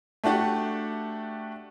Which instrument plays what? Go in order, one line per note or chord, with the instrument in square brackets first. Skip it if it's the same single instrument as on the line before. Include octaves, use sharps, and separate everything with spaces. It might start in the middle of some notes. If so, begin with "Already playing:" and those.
[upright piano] A3 D4 F#4 G4